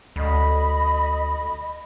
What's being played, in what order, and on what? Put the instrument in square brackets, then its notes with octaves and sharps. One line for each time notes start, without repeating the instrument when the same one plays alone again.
[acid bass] D2 [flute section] D#5 B5